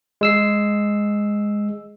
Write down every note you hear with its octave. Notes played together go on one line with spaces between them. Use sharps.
G#3 E6 C7